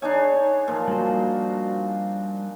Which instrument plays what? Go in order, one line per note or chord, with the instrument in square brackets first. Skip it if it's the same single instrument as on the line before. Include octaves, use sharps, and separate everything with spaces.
[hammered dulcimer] D4 D#4 G#5 [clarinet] C#5
[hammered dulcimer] A#2 F3
[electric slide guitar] G3 D#4 C5 [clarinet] F#4